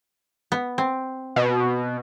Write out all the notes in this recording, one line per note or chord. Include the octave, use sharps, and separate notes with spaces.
B3
C4
B2